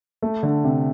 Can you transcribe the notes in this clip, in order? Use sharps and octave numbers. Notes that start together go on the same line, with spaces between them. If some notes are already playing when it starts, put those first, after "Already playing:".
A3
D3
C3